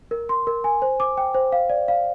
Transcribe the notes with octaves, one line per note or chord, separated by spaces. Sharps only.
A#4
C6
A#4
G#5
C5
D6
G5
C5
F5
D5
F5